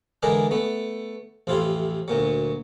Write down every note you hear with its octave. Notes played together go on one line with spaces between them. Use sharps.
D3 E3 G#3 D4 G#4 A#4
A3 B3
A1 F2 C3 E4 F4
D2 A#2 F#3